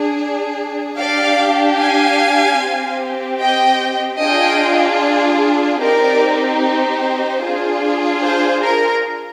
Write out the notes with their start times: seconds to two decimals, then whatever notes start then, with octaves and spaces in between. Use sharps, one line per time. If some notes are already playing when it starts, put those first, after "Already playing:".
Already playing: D4 G#4
0.98 D4 G4 D5 F5
1.79 F5 G#5
2.60 C4 G4
3.41 D#5 G5
4.21 D4 F4 G#4 D#5 G5
5.82 C4 D#4 G4 A#4 D5
6.63 C5
7.43 D4 F4 G#4
8.24 C5
8.64 A#4